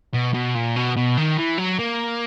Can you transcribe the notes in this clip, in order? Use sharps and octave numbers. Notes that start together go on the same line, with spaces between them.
B2
B2
A#2
B2
B2
D#3
E3
F#3
A#3